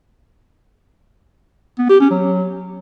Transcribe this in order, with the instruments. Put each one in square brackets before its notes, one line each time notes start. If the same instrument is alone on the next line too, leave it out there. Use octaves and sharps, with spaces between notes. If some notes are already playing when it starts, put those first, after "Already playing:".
[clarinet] B3
G4
C#4
F#3